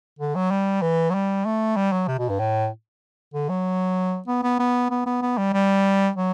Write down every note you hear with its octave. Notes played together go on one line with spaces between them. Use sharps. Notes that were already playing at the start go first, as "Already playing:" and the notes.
D3
F#3
G3
E3
F#3
G3
A3
G3
F#3
C3
B2
G2
A2
D3
F#3
B3
B3
B3
B3
B3
B3
G3
G3
F#3